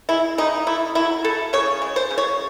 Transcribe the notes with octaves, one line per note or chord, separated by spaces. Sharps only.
G#3 E4
C#3 D#4
A3 E4
F#3 E4
C#3 A4
C#3 C#5
G#3
C5
C#3
C#5